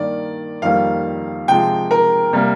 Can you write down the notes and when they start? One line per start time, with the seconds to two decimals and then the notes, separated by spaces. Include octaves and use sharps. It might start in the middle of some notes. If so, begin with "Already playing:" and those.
Already playing: G2 D#3 A#3 D5
0.62 F2 D#3 G3 A#3 F5
1.48 C3 F3 G#3 G5
1.91 A#4
2.33 C3 G3 A#3